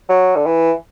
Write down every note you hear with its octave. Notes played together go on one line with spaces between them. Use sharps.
F#3
D3
E3